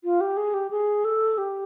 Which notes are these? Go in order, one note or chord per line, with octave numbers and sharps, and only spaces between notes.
F4
G4
G#4
G4
G#4
A4
G4